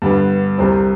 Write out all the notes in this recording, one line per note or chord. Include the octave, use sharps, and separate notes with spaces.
G2 D3 G3 B3
C2 C3 G3 C4